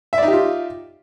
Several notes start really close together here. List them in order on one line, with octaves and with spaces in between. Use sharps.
E5 D5 D#4 G4 F4